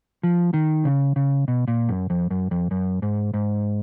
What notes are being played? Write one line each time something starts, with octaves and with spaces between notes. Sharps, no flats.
F3
D#3
C#3
C#3
B2
A#2
F#2
F2
F#2
F2
F#2
G#2
G#2